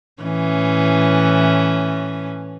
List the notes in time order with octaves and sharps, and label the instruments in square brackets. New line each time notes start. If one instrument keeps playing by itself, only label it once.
[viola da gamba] A2 E3 C#4